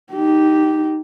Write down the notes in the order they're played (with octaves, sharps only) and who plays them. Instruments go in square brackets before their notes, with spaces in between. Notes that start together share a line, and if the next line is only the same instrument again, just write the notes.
[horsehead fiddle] D#4 G4